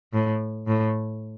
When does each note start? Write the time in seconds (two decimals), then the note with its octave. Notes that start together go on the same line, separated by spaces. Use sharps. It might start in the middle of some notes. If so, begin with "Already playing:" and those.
0.13 A2
0.67 A2